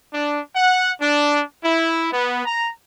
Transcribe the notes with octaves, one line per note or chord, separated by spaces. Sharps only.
D4
F#5
D4
E4
B3
A#5